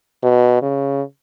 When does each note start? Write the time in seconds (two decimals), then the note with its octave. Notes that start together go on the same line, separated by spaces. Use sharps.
0.23 B2
0.62 C#3